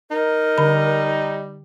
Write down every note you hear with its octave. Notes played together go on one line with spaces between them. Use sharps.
D#4 A#4
D3 G3 B5